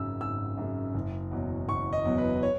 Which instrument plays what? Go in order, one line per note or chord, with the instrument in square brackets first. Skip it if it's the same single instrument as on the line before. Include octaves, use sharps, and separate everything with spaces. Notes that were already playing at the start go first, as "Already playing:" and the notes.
Already playing: [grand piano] G#1 F#2 C#3 E6
G#1 E6
F#2 C#3
F#1
E2 B2 F#3
F#1 C#6
D#5
E2 B2 F#3
B4
C#5